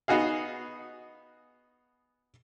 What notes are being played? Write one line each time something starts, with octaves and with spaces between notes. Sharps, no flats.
B3 D#4 F#4 G#4 F5